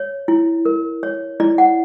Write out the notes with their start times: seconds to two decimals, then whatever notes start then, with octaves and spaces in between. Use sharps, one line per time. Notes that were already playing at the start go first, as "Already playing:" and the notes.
Already playing: C#5
0.28 E4
0.65 A#4
1.03 C#5
1.40 E4 D5
1.58 F#5